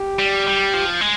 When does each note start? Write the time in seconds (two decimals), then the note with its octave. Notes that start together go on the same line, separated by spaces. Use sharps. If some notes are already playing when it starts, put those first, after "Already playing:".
Already playing: G4
0.19 G3
0.47 G3
0.74 F3
1.01 G#3